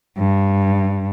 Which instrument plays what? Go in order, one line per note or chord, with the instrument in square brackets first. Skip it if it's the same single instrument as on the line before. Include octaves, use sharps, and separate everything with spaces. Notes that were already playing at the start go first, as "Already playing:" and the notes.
[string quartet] G2